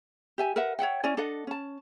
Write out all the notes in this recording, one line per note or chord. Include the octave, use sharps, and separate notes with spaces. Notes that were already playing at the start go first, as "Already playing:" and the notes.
G4 E5 G#5
A#4 B4 E5 F#5
C#5 E5 F#5 G5
C#4 E4 D5 G#5
D4 A4 D#5 F#5
C#4 A5